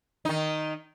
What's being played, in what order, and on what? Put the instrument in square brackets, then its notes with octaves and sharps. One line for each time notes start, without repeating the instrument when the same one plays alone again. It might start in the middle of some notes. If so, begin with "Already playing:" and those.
[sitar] D#3 D#4